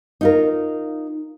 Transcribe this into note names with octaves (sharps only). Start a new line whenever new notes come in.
D#4 F4 A#4